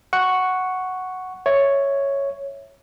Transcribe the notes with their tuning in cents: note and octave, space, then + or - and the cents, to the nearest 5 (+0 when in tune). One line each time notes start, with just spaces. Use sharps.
F#5 +0 C#6 +0
C#5 +0 E5 +0